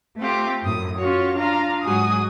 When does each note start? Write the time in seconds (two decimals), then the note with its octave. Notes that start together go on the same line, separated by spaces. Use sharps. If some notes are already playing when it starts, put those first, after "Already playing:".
0.18 A3 C4 F4 G4
0.64 F#2 A2 D#6
0.99 C#4 F4 F#4 C#5
1.36 D4 F4 F5 A#5
1.84 G#2 F#3 G#3 F#4 G#5 D#6